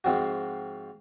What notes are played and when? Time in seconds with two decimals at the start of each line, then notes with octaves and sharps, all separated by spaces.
0.04 G#2 F3 C4 F#4